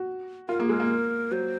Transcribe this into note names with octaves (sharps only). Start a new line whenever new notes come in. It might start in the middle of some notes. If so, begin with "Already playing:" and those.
Already playing: F#4
F4 A#4
A#3 G#4
G#3 A#4
A#3
F#3 C5